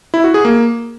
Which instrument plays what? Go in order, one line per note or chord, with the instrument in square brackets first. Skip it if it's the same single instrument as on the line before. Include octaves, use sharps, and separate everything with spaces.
[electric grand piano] E4
F#4
G#4
A#3